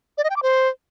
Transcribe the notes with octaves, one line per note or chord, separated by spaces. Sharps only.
D5
D#5
G5
D6
C5